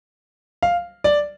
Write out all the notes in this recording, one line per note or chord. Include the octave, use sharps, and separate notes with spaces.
F5
D5